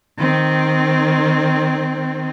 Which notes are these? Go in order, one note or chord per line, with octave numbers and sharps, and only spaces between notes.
D#3 C4